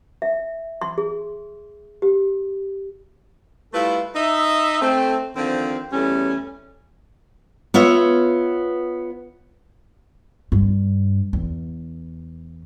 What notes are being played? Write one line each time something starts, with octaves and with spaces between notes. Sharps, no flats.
E5
C6
G#4
G4
G3 A3 E4 F4 A4 B4
D#4 E5
A3 C4
D3 D#3 F3 C4
E2 G3 A3 C#4
B3 F4 C#5 E5
G2
E2